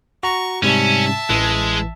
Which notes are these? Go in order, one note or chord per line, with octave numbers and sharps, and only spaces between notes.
F#4 A#5 C#6
G#2 C3 G3 C#4 E5 A5
A1 E3 G#3